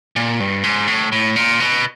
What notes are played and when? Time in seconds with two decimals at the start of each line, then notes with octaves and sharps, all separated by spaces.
0.16 A#2
0.40 G2
0.64 G#2
0.88 A2
1.12 A2
1.36 A#2
1.60 B2